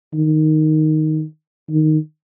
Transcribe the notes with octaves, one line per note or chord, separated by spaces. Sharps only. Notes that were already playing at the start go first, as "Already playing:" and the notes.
D#3
D#3